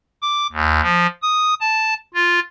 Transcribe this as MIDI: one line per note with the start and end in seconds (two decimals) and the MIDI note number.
0.22 0.47 86
0.52 0.80 39
0.83 1.07 53
1.22 1.54 87
1.61 1.94 81
2.14 2.40 65